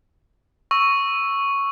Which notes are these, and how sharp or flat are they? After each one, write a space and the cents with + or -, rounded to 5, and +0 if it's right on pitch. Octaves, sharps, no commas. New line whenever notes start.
C#6 +0 E6 +0